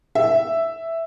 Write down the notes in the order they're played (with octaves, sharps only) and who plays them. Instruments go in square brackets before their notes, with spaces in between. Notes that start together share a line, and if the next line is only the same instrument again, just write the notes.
[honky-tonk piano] E5